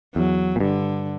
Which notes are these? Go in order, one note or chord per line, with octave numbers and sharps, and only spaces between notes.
E2 F#3
A#2
G2 D3